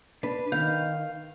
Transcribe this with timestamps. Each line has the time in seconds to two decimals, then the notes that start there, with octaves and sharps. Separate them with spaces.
0.23 D4 B4
0.52 D#3 F5 G6